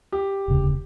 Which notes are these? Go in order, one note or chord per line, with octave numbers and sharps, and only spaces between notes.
G4
E1 D2 C#3